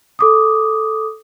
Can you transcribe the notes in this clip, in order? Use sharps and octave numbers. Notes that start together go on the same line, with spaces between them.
A4 D6 D#6